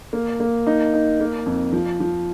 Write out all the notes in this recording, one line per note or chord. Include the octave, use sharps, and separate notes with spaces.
A#3
A#3
D#4
D#4
A#3
F2
F3
F3